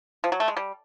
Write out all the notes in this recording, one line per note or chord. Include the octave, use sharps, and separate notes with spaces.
F3
F#3
A3
G#3
G3